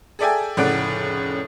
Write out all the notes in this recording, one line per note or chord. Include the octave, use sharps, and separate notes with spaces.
G#4 A4 D5 E5 G5 G#5
F1 A2 C#3 D5 F#5 D7